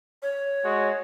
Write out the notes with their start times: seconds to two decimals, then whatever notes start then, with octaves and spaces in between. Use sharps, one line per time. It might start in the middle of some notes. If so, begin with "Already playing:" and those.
0.22 C#5
0.63 G#3 F#4